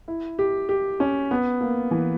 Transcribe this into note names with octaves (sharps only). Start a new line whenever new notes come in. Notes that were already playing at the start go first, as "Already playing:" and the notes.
E4
G4
G4
C#4
B3
A#3
E3